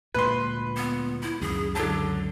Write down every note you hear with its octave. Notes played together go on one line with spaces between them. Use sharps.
D2 A#2 G#3 B4 C6
B3
E4
C#2 F#2 D#3 G#4
D3 F#3 A5